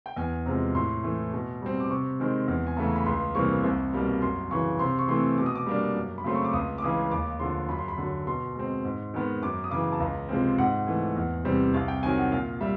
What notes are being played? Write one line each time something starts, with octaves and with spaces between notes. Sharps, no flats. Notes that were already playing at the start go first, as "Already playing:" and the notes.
G5
E2 G#5
C3 F3 G#3 A#5
A2 C6
E3 A3
B2
G3 C4
D6
C3 C#6
D#3 G#3 C4
E2
G#5
C#3 E3 A3 A5
A#5
B5
C#2 C6
C3 E3 G3 A#3 C#6
C2
B2 G3 A#3
F#2 C6
C#3 E3 C#6
C3 C6
C#6
E3 A3 C4 C6
B2 D6
D#6
D6
G3 A#3 D4
F#2
B5
C#3 F#3 A3 C4 C6
C#6
D6
C#2 D#6
D6
C#3 E3 G#3 D#6
D#2 D6
D3 F3 C6
F#2 B5
C6
B5
D3 F#3
B2 C6
G#3 C4
G#2
D#3 G#3 B3
F#2 D6
D#6
C#3 E3 D6
A5
C#2 A#5
C3 F3 G#3 C4
G#2 F#5
E3 A3
E2
C3 E3 G3 C4
C2 F5
G5
C3 D#3 F#3 G#5
F#5
A#2 F5
G3 E5